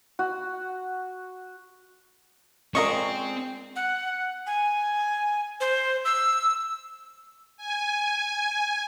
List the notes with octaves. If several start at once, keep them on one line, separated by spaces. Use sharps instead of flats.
F#4
G#3 C4 C#4 F4 A#4 D5 D#5 C#6
F#5
G#5
C5
E6
G#5